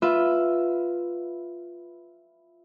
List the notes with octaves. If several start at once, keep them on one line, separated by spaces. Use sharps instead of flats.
F4 B4 E5